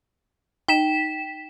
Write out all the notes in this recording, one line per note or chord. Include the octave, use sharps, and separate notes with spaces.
D#4 G5 B6 E7